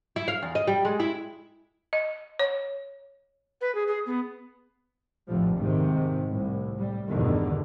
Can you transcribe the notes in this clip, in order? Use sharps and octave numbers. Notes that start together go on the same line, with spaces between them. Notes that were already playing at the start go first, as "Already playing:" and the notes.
E4
F5
E2
D#5
G3
G#3
E4
D#5
C#5
B4
G#4
G#4
B3
F1 A#1 A2 D3 F3 G3
G#2 C3 D#3
C2 A2
A2 G3
A1 E2 G2 B2 D3 D#3